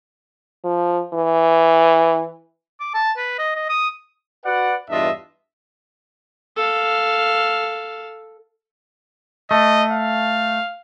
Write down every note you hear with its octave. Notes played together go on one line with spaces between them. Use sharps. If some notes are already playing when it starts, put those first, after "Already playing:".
F3
E3
D6
A5
B4
D#5
D#5
D#6
F#4 B4 D5 F#5
E2 G2 D4 F4 D#5 E5
A4 F5
A3 D#5
F5